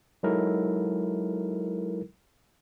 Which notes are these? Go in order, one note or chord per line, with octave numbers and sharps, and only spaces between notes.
F#3 G#3 D#4 E4 A4 A#4